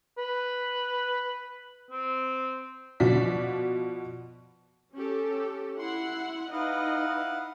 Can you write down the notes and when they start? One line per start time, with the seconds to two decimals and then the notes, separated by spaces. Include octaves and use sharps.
0.18 B4
1.91 C4
3.00 B2 F3 F#4 D5 B6
4.95 C#4 G4 A4
5.79 E4 F#5 C6
6.53 D#4 E4 B4 D#5 F5 F#5